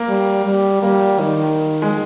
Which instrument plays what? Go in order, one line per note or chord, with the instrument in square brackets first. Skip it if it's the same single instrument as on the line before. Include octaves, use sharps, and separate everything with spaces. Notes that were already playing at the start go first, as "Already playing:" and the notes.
Already playing: [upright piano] A#3
[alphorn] G3
G3
[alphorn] G3 [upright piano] A#3
[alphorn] D#3
[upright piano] G#3